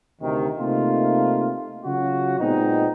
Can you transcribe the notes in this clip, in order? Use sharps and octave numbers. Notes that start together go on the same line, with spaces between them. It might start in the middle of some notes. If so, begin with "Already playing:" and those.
D2 C3 D#3
C3 A3 A#3 D#4 F4
C#3 F#3 F4 F#4
A#2 G#3 B3 C4 D#4